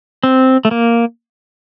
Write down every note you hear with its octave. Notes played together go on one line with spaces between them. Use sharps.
C4
A3
A#3